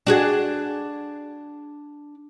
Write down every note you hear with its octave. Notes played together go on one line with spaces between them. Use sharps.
D4 F#4 G#4